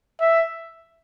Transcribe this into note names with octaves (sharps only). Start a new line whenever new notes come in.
E5